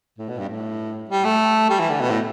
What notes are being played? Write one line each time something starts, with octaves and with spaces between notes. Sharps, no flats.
A2
B2
G2
A2
G3
A3
G3
E3
D3
B2
A2